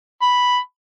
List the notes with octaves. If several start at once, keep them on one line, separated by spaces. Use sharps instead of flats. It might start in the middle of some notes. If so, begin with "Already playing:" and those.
B5